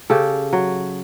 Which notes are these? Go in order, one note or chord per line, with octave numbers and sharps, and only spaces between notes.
C#3 G4 A4
F#3